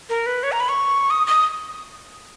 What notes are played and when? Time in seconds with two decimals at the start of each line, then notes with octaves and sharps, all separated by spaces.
0.10 A#4
0.26 B4
0.43 C#5
0.52 A#5
0.60 B5
0.69 C#6
1.10 D#6
1.27 D#6